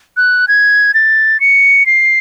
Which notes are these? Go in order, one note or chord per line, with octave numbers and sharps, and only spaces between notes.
F#6
G#6
A6
C#7
C7